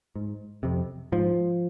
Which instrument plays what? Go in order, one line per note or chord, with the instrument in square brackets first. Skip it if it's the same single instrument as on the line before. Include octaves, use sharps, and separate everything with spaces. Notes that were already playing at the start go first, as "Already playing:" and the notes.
[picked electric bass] G#2
F2 C3
G#2 F3